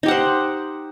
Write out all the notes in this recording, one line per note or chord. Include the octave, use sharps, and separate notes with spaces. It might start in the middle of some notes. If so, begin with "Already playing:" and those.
D#4 G4 C5 F#5